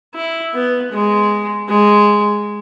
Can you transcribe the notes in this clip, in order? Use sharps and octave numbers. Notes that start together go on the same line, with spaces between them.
E4
B3
G#3
G#3